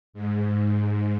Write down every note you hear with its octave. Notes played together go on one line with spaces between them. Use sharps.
G#2